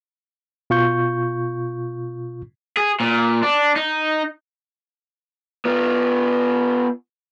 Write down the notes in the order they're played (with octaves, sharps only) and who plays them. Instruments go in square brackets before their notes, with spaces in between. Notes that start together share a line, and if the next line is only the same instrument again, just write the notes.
[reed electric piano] B2 F4 C#6 G6
[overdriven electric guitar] G#4
A#2
D4
D#4
[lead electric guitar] B3 F4